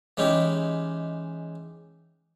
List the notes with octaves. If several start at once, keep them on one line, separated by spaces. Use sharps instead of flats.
E3 G#3 C#4 D#4 E4 G4